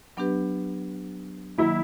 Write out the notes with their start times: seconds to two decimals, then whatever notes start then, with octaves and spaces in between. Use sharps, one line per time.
0.17 F#3 B3 D4 G4 B4
1.58 D#3 F#3 A#3 E4